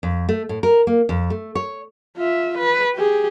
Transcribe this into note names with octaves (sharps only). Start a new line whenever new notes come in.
F2
A3
A2
A#4
A#3
F2
A3
C#5
F4 E5
B4
G4 G#4